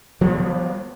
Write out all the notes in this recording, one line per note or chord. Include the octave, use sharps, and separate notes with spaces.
F3 G3 B3